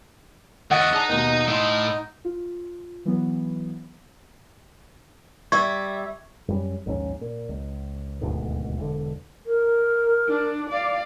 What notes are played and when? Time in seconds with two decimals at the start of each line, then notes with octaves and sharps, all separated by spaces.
0.71 D#2 D#5 E5 F#5 C#6 A6
0.93 D4 G#4 D#5 A#5
1.09 D#2 B2 D#4
1.48 A2 D#5 C6
2.25 F4
3.05 E3 F#3 B3
5.52 G3 E5 C#6 G#6
6.48 F#2 G3 C#4
6.86 A#1 D#2 G#2 C#4
7.21 A#2
7.49 C#2
8.21 D#1 D2 G#2 B2
8.77 E1 D3
9.46 A#4
10.28 D4
10.70 D5 F5